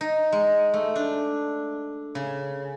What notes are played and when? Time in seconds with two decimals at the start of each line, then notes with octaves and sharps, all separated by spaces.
0.01 D#4
0.32 G#3
0.74 A3
0.96 D4
2.15 C#3